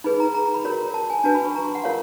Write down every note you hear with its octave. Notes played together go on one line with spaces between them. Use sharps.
D#4 G#4 B4 B5
A#5
A#5
A#5
B5
F#4 A#4 C#5
A5
G#5
D4 F#4 B4 A5
B5
C#6
A#5
C6
F#5
F4 A#4 C#5 F5